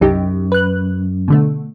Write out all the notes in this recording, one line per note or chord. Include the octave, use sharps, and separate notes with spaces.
C2 F#2 D#4 G4
B4 F#6
B2 D3 A3